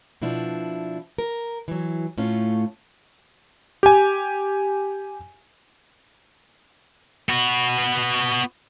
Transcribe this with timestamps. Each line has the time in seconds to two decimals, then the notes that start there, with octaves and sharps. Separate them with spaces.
0.22 B2 F3 D4 E4
1.18 A#4
1.68 E3 F#3
2.18 A2 A3 C#4 F4
3.83 G4 G#5
7.29 B3 F#4